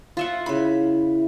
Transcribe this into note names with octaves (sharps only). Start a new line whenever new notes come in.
F4 E5 F#5
C#3 E4 B5